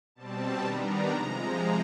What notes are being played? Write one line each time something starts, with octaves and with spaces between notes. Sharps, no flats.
B2 G3 C4 A5
D#3 G3 B3 D4 A#5
C3 F3 G#3 A#5